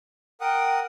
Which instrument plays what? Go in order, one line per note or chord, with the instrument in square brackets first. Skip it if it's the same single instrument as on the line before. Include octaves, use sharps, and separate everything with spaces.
[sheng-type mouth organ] A#4 F#5 D#6 [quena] G5